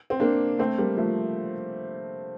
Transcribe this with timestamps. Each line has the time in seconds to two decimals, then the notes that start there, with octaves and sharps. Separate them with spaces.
0.10 C4
0.20 A#3 D4
0.59 A3 C4
0.78 G3 A#3
0.97 F3 A3